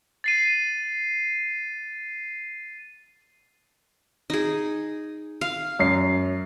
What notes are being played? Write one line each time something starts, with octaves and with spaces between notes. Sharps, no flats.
A6 C7 D#7
D#4 G#4
F5
F#2 C7